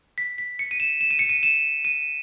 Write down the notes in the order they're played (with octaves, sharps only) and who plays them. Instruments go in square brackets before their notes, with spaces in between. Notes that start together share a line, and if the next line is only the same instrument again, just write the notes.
[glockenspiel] B6
B6
C#7
D#7
E7
E7
D#7
C#7
D#7
E7
D#7